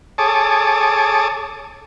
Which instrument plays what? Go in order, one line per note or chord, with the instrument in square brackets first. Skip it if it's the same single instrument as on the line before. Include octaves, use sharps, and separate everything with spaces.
[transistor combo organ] G#4 A4 C#5 A5 D6 D#6